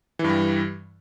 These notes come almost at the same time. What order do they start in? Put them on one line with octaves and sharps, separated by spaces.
E3 G2 G3